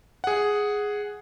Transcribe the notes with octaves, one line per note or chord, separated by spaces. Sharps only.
G#4 F#5